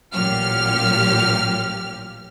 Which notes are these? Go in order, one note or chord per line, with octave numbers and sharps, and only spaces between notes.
A1 A#2 F#3 G4 F6